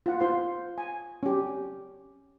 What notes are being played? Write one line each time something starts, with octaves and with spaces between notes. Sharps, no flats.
F4 F#5
F4 C5 C6
G#5
C#4 G4